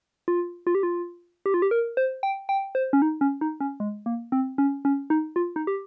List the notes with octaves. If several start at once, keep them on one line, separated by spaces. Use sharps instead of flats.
F4
F4
G4
F4
G4
F4
G4
A#4
C5
G5
G5
C5
C#4
D#4
C#4
D#4
C#4
G#3
A#3
C4
C#4
C#4
D#4
F4
D#4
G4